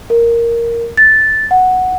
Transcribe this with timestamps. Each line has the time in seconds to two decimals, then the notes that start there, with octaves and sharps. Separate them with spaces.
0.10 A#4
0.97 A6
1.51 F#5